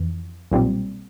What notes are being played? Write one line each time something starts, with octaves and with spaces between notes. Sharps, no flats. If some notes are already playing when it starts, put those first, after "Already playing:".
Already playing: F2 E3
B1 A#2 G3 C4